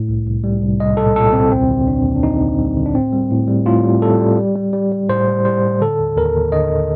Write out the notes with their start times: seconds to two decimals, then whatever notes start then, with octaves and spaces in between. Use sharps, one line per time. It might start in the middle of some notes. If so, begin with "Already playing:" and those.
Already playing: A2
0.09 C2
0.27 C2
0.44 G3
0.62 C2
0.80 C2 D#5
0.97 A#2 A4
1.16 A#2 A4
1.33 C2 C4
1.51 D#2 C4
1.69 D3
1.87 D#2 D4
2.05 D#2
2.15 D4
2.22 D#2 D#4
2.41 D3
2.58 G3
2.76 D3
2.86 D4
2.95 A2 C4
3.13 G3
3.31 A2
3.48 G3
3.66 A2 F4
3.84 G3
4.02 G3 A4
4.21 G3
4.38 G3
4.56 G3
4.73 G3
4.92 G3
5.09 A2 C5
5.28 G3
5.45 G3 C5
5.64 A2
5.81 D3 A4
5.98 D#2
6.16 D#2 A#4
6.35 D#2
6.52 D3 D#5
6.70 D3